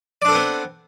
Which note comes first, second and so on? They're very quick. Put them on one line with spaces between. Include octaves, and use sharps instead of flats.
D5 D4 A4 C4 B3